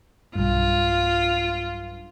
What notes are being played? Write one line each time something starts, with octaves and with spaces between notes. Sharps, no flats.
B1 G2 F4